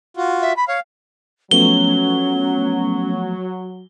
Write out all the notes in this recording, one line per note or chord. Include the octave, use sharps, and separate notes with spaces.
F4 F#4
E5
B5
C#5 F5
F3 F#3 A3 B3 C#4 G7